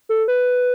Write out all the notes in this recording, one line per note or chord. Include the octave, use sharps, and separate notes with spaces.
A4
B4